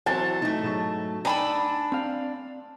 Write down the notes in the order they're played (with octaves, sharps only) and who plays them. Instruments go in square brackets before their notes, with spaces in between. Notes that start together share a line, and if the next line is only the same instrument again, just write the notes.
[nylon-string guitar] E3 F#3 C4 [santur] A5
[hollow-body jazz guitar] B1 [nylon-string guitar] A3 D#4
[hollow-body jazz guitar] G#2 B2 F#3
[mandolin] D4 B5 E6 [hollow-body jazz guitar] D#4 G5 A#5 [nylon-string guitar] G#5
[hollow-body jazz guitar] C4 F5